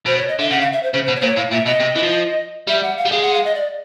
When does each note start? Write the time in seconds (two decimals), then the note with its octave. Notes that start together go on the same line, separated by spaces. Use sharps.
0.06 B2 C5
0.17 C#5
0.28 D#5
0.39 D3 E5
0.50 C#3 F#5
0.61 F5
0.72 E5
0.83 C5
0.93 C#3 C5
1.05 B2 C5
1.15 C#5
1.21 A#2 C5
1.27 C#5
1.37 A2 F5
1.52 A#2 E5
1.66 B2 D#5
1.80 C3
1.96 E3
2.03 F3
2.67 G3 E5
2.82 F#5
2.97 F5
3.05 G3
3.11 G#3 F5
3.22 F#5
3.34 F5
3.45 D#5
3.55 D5